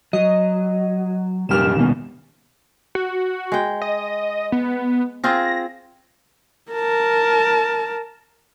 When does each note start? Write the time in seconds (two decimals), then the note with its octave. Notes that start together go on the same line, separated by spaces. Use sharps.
0.13 F#3 D#5
1.49 C2 F#2 A#2 G4 F6 E7
1.76 D#2 B2
2.95 F#4
3.52 G#3 G5
3.82 D#5
4.52 B3
5.24 C4 F4 G#4 A#6
6.72 A#4 A5